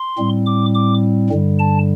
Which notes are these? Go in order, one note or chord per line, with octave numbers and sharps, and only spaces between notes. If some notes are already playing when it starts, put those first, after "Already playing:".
Already playing: C6
A2 G3 C4
D6
D6
G2 D3 G3
A5